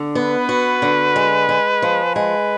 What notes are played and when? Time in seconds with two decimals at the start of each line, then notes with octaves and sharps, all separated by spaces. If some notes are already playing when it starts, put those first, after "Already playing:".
Already playing: D3
0.15 B3 B4
0.49 F#4
0.82 D3
1.16 G#3
1.49 G#3
1.82 F3
2.16 G#3 B4